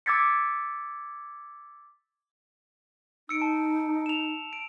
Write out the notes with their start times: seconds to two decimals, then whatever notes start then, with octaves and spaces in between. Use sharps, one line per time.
0.06 D6 E6 G#6 A6 B6 C#7
3.29 D#4 E6 C#7 D7
3.42 A5
4.06 E7 F7
4.53 D7